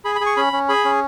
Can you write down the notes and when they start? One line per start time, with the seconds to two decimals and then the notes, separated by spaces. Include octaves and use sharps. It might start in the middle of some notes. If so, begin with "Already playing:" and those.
0.05 G#4 B5
0.15 B5
0.21 G#4
0.26 C#6
0.37 C#4 B5
0.53 C#4
0.69 G#4 B5
0.85 C#4